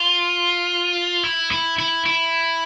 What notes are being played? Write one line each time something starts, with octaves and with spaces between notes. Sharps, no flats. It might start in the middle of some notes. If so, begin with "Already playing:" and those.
Already playing: F4
E4
E4
E4
E4